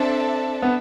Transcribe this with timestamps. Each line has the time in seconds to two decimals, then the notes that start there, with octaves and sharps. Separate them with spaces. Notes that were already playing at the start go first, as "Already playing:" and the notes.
Already playing: C4 D4 A4 E5 A5
0.62 B3